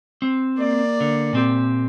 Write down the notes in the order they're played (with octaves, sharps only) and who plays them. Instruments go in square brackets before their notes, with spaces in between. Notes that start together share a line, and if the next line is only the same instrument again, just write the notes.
[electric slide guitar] C4
[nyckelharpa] A#3 D5
[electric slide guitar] D3
A#2 C4 G4